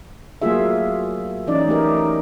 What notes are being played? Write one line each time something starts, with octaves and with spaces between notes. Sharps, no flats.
F#3 A3 A#3 F4 G#4 E5
E3 C#4 D#4 D5
A3 D#4 G4 A#4